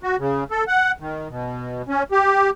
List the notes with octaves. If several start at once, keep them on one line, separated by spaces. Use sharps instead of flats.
F#4
C#3
A4
F#5
D#3
B2
C#4
G4